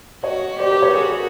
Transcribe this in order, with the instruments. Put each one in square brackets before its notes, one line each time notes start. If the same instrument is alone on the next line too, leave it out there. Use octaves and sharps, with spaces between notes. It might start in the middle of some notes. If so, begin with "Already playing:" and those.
[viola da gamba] F#4 [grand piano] C#5 D#5
[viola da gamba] G4 [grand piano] C5 D5
[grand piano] A#4 C5
B4 C#5
[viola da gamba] F#4 [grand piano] G#4 A#4